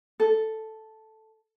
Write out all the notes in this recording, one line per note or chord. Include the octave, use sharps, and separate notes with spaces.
A4